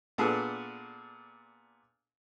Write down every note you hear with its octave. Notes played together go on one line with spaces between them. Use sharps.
A#2 B3 D4 G#4 A4